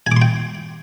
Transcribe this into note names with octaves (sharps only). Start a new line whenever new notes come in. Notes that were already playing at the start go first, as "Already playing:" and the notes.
G#5
D6
C6
G5